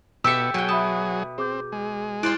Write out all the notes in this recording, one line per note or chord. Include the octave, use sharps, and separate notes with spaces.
B2 G4 A4 E5 E6 C#7
B2 F#3 G#4 G5
E5 A5 B5 D#6
C4 G#4 D6 G6
G#3
E4 F4 C5 D5 F#6